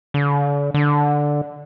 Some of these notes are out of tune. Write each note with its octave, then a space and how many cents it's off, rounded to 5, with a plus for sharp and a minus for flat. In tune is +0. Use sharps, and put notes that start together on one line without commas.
D3 -40
D3 +0